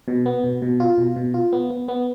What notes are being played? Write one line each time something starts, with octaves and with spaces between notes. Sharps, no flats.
B2
B3
B2
B2
F4
B2
B2
F4
B3
B3
B3